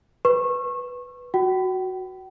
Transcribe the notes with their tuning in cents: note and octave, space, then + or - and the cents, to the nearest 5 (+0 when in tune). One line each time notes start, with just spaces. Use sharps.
B4 +0 C#6 -25
F#4 +0 G5 -40